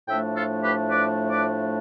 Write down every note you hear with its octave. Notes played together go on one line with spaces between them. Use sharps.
A2 F3 A3 D4 E5 G5
F4 A4
G4 B4
B4 D5
B4 D5